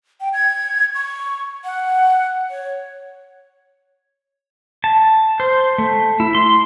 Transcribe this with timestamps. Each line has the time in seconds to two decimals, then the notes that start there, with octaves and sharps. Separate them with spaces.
0.20 G5
0.33 G#6
0.95 C#6
1.64 F#5
2.50 C#5
4.84 A5
5.40 C5
5.78 A3
6.20 E4
6.35 C6